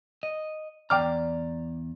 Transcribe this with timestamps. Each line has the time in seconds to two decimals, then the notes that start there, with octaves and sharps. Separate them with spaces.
0.23 D#5
0.90 E2 D5 G5 A#5 D6 F6